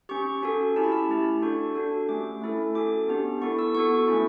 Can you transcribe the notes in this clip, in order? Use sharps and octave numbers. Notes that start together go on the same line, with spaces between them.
C#4 G4 C#6
C#4 F#4 A4
C#4 E4 G4 A5
B5
A5
A3 E4 G4
D4 F#4 A4 C#6
D4 F#4 A4
A3 C#4 G4 D6
A3 E4 A4
C#4 F#4 A4 D6
B3 D4 G4
B3 E4 A4 C#6
E6
B3 F#4 A4 C#6
A3 C#4 E4